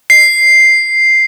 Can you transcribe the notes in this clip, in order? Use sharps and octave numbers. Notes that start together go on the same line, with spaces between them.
C7